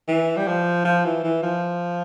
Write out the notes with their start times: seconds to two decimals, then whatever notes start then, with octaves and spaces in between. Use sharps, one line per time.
0.08 E3
0.37 G3
0.47 F3
0.85 F3
1.05 E3
1.23 E3
1.43 F3